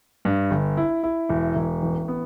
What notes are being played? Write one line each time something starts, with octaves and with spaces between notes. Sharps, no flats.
G2
G1
E4
E4
E1
E1
A1
B3